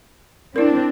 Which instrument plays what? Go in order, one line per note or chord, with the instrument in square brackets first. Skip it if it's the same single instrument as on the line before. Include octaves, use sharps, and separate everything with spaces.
[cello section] C4 D4 [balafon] E4 A#4